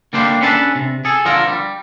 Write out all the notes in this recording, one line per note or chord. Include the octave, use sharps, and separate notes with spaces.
D3 G3 A#3 D4 G4 C5
C#4 D4 A4 B4 D#5 A5
C3
G#4 A4
D3 F3 F4 A4 A#4
G3